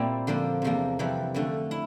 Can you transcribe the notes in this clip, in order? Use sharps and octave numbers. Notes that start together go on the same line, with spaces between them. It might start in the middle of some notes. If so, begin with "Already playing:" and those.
Already playing: A#2 G3 C4 E4
D3 F3 A#3 D4
E2 C3 F3 A#3
F2 C3 E3 G3
F2 D3 A3
E4